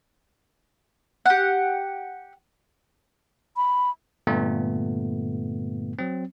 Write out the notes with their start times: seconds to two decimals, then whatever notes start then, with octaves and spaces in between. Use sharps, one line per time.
1.26 G4 F#5
3.57 B5
4.27 G2 A#2 D3 A3 B3
5.99 F#3 C4